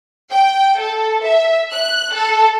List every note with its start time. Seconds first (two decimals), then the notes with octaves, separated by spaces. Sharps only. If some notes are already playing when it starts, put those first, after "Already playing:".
0.30 G5
0.79 A4
1.23 E5
1.72 F#6
2.14 A4